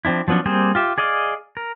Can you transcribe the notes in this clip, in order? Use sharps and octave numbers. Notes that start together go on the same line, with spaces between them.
F3 C4 D4 E4
F3 F#3 B3 C#4 D4
G3 A#3 C4 G#4 C5
F4 G4 E5
G#4 D5 D#5 F5
A#4